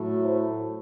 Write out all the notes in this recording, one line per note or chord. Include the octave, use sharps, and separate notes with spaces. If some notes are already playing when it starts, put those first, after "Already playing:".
Already playing: A2 F#3 A3
C5